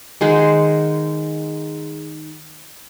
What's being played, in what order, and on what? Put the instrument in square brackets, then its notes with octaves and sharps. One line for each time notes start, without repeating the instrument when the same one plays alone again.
[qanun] D#3 G#3 C5 F#5